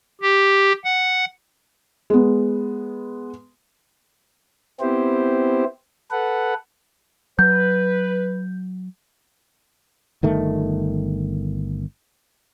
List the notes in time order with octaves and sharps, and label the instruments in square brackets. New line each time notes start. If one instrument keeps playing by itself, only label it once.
[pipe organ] G4
F#5
[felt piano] G#3 B3
[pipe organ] B3 C4 E4 G4 C5
A4 B4 F#5
[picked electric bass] F#3 [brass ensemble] B4 [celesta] G6
[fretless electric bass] G1 D#3 A3